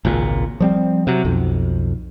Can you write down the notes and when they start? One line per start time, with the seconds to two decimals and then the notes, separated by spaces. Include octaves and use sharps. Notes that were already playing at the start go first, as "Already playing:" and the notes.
0.05 G#1 C#2 A#2
0.60 F3 G3 C4
1.07 C3 F#3
1.25 B1 F2